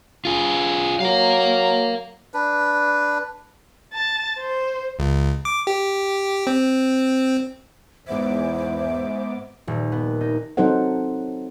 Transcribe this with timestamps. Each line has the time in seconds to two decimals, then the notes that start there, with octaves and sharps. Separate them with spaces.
0.25 F4 G#4
1.00 F#3 A#4 F5
2.34 D4 B4
3.93 A5
4.39 C5
4.99 C#2
5.45 D6
5.67 G4
6.47 C4
8.07 E2 G#2 B3 C5 E5 D6
9.67 D#1
9.92 B3
10.21 D#4
10.57 F#3 C4 D#4 A4 C5 F#5